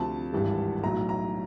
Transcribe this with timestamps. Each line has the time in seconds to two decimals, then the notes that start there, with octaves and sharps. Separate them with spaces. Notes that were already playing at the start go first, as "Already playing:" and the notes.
Already playing: D2 C3 F3 A5
0.33 G#1 G2 E3 G3
0.83 B1 A2 F#3 A#5
1.09 A#5